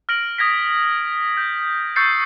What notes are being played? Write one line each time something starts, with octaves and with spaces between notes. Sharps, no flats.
F6 A#6 D7 F#7
D#6 G#6 A#6 B6
G6
C#6 E6 G6 A6 C7 C#7